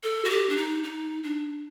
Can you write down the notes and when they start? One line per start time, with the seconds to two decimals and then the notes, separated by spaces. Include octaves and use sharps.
0.03 A4
0.25 F#4
0.30 G4
0.49 D4
0.57 D#4
0.83 D#4
1.23 D4